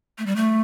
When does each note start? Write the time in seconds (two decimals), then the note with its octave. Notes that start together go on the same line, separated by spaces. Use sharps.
0.18 A3
0.26 G3
0.36 A3